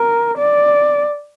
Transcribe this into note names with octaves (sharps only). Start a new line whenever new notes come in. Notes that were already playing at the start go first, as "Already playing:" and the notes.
Already playing: A#4
D5